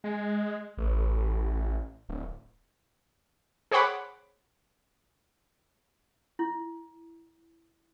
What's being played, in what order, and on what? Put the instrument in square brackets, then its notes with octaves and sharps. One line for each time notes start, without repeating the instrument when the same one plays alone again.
[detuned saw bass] G#3
A1
D1
[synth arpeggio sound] G#4 C5 C#5 F#5 B5 D6
[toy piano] E4